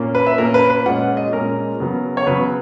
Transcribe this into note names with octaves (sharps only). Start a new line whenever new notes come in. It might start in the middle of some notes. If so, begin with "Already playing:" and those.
Already playing: A#2 A#3 C#4
B4
E5
A#2 A#3 C#4 A#4
B4
B4
A#2 G#3 C#4 F#5
D#5
A#2 G#3 C#4 A#4
C#3 F#3 B3
C#5
C#3 F#3 B3 B4